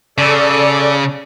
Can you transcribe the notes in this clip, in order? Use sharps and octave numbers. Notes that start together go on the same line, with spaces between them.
C#3 A4 D5